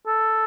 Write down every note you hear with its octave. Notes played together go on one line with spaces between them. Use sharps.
A4